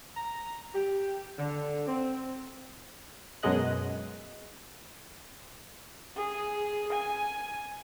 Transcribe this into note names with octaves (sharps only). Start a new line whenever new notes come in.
A#5
G4
D3
C4
F#2 B2 F#3 G#3 D#5 F#6
G#4
G#5